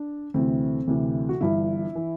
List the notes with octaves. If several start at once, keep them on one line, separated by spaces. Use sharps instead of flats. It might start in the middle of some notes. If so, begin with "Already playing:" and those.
Already playing: D4
D2 C3 E3 C4
D2 C3 E3
F#4
G1 G2 E3 E4
E3